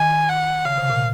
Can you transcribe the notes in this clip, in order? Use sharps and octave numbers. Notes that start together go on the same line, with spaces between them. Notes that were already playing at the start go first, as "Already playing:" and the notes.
Already playing: D#3 G#5
F#5
C#3 F5
C3
A#2